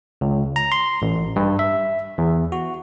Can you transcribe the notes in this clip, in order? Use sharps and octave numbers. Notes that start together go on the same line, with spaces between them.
C#2
A#5
C6
A1
G2
E5
E2
F#4